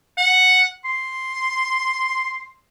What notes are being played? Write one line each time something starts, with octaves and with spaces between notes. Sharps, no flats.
F#5
C6